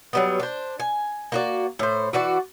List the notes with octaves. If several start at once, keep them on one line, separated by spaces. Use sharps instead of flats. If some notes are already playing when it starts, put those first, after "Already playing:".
F#3 G3 B3
D4 C5
G#5
A#3 F#4 D5
A2 C5
E3 F#4 D5